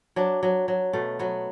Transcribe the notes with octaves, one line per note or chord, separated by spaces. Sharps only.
F#3 D4
F#3
F#3
B2 A3
F#3 B3